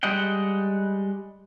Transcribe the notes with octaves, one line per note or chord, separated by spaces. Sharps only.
G3 G#3 D#5 F#5 G5